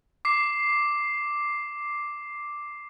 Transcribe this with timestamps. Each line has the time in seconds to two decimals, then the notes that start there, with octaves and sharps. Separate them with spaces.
0.25 D6 C7